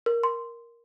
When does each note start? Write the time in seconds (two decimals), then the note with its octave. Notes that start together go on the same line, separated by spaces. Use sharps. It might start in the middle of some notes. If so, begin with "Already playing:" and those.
0.06 A#4
0.23 C6